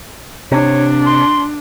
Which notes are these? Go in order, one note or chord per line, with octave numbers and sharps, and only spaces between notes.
C3 D4 C#5
C6